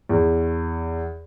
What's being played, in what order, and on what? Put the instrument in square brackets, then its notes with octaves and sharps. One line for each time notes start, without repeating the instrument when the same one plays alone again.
[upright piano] E2